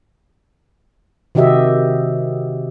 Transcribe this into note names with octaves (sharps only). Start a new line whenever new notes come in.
C3 D#3 F#4 G4 D#5 E5